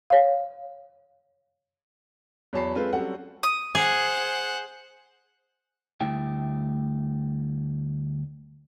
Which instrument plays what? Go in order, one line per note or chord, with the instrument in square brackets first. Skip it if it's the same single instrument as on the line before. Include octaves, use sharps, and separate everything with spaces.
[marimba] C#5 F5
[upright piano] E2 F#3 C#5 A5 B5 C7
G#3 C4 F4 A4 B4
F#3 G3 C4 C#4 A4 F#5
[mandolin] D#6
[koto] G#4 [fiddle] C5 F#5
[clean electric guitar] D2 G3 A3 E4 G5